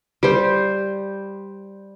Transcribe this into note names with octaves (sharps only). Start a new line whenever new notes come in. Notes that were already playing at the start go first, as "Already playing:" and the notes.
G3 C5